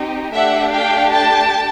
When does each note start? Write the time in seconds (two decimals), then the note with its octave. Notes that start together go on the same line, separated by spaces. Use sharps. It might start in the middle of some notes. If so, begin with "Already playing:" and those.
Already playing: C4 D#4 G4
0.33 A3 D4 G4 E5 F#5
0.73 F5 G5
1.12 G5 A5